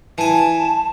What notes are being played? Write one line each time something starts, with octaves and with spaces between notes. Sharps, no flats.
E3 G#5 A5